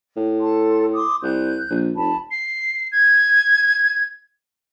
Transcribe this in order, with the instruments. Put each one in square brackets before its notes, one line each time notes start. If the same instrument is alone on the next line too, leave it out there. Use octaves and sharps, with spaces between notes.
[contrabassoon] A2
[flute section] A4 A5 C6
C6 D6 D#6
[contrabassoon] C2 [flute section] F#6 G6
[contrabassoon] A#1
[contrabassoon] F1 [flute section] A5 B5
[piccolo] C7
G#6